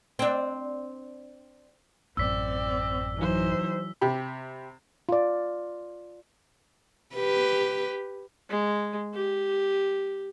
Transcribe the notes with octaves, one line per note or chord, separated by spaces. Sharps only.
C4 D4
A1 F#2 C4 D5 E6 B6
E3 F#3 D#4 C5
C3 G4 B5
F4 D5
G4 B4
G#3
G4